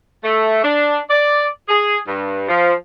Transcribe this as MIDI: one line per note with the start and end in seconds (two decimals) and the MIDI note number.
0.23 0.62 57
0.64 0.97 62
1.10 1.46 74
1.69 1.98 68
2.07 2.48 43
2.49 2.72 53